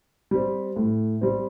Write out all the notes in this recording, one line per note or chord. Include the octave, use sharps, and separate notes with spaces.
G3 C4
A2
G3 C4